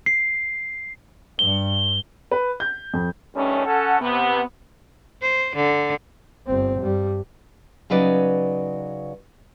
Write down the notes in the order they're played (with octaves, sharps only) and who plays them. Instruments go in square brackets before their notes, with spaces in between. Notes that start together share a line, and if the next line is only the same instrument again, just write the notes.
[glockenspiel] C7
[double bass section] G2 [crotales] G7
[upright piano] B4
G6
F2
[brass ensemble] G2 D#3 G3 A3 C#4
C#4 A4 F#5
C3 B3
[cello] C5
D3
[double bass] G1 C4
G2 G3
[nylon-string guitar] C#3 F#3 D#4 B4 D5 D#5